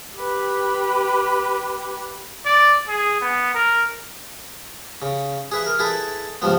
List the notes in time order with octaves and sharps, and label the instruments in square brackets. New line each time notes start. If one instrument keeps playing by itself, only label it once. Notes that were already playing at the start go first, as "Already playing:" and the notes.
[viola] G4 B4
[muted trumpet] D5
G#4
B3
A#4
[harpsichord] C#3
G#4 B4 E5
A#4
E4 G#4 A4 B4
C#2 G2 F3 B3